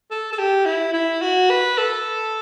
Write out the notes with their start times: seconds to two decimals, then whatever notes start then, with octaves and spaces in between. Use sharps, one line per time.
0.11 A4
0.33 A4
0.39 G4
0.66 E4
0.93 E4
1.22 F#4
1.50 B4
1.78 A4